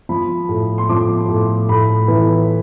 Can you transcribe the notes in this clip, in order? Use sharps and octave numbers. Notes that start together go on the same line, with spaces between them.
F3 B5
A2
C6
F3 D6
A2
A2 B5
E3